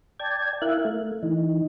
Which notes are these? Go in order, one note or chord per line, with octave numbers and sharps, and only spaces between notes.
D5 G5 A5 G#6
E4 A#4 E5 F5 F#6
A3
E3 D#4